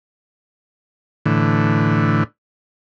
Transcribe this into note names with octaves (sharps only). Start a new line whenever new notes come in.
A2 D3 E3